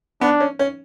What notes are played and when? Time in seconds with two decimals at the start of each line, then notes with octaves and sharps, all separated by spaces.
0.21 B3 D4
0.40 C#4
0.59 C#4